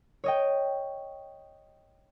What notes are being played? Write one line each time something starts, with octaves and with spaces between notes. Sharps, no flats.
C#5 D#5 G5